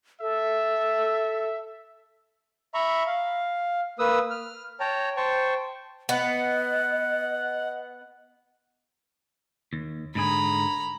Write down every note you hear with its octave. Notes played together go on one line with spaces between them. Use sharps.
A4 E5
E5 A#5 B5 C#6
F5
A#3 B4 D#6 E6
F6
C#5 G5 A5 A#5
C5 G5 A5 C#6
B3 D#5 F#5
D#2
G#2 D3 G#4 A#5 B5